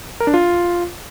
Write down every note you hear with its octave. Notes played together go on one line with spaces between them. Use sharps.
A#4
D4
F4